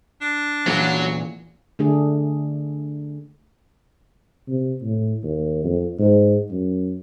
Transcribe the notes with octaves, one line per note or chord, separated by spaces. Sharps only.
D4
E2 A#2 E3 F#3
D3 A3 D4 G#4
C3
A2
D#2
F2
G#2
F#2